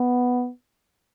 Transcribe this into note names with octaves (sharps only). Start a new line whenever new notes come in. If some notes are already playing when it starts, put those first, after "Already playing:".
Already playing: B3